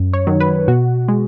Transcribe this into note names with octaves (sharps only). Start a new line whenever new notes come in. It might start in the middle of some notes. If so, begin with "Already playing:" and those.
Already playing: F#2
C#5
D#3 F#3
B4
B2 F#4
G#3